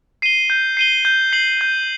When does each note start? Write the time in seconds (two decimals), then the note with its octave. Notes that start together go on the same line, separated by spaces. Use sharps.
0.22 C7 D#7 G7
0.50 G6
0.77 C7 D#7 G7
1.05 G6
1.33 C7 F#7
1.61 G6